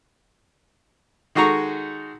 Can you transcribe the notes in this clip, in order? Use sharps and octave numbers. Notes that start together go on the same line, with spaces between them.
D#3 G#3 F#4 A4 A#5 C#6